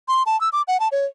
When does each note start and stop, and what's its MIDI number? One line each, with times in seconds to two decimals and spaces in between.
0.08 0.23 84
0.26 0.39 81
0.41 0.49 88
0.53 0.62 86
0.68 0.79 78
0.80 0.88 81
0.92 1.06 73